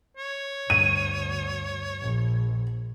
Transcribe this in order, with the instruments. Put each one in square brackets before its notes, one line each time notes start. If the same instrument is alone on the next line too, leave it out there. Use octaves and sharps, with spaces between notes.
[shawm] C#5
[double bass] D2 [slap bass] G2 [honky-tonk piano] D#7
[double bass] A#1